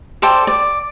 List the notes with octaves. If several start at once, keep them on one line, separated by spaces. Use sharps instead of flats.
A4 C5 D5 G5
D5